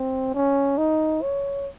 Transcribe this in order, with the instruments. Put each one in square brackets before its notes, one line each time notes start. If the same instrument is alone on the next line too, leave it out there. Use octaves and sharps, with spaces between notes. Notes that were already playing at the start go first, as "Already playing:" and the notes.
Already playing: [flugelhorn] C4
C#4
D#4
C#5